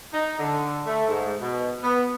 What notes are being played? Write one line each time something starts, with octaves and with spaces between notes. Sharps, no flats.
D#4
D3
A3
G#2
B2
B3